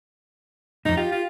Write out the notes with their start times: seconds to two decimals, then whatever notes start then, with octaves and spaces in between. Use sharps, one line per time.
0.85 F2 G#2 D#4
0.97 F4 G4
1.12 F4